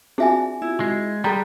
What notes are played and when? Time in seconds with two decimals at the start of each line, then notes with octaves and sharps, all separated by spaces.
0.18 C4 D4 F4 F#4 G#4 E5 G#5
0.62 E4
0.80 G#3
1.24 G3 G4 G#4 A5 A#5 C6 F#6